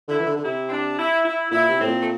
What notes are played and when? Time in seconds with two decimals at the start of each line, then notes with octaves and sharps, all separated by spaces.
0.08 D3 E4
0.20 E3
0.26 D3
0.37 D3
0.44 C3 E4
0.65 C4
0.71 D4
0.97 E4
1.25 E4
1.51 A#2 E4
1.69 C3
1.79 A2 C4
1.87 A#2
1.98 A3